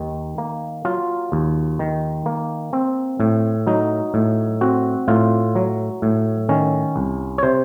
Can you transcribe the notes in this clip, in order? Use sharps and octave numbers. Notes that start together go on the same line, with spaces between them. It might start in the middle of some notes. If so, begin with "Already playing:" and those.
Already playing: D#2 D#3
A#3
F#3 F4
D#2
D#3
A#3
C4
A2
F#3 D#4
A2
C4 F#4
A2 F4
F#3
A2
D#3 C#4
C2
C#5
C3 C5